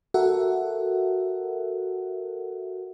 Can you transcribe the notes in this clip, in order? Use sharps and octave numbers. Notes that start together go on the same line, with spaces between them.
F#4 A4 A#4 E5 F#5